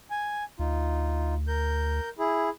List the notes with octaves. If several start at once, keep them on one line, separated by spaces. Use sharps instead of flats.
G#5
D2 D#4 F4
A#4 G6
E4 G#4